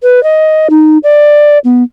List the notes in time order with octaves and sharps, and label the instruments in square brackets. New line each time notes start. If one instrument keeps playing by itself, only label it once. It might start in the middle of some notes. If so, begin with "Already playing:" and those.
[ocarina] B4
D#5
D#4
D5
B3